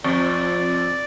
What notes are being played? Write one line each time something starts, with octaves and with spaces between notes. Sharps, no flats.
F2 D5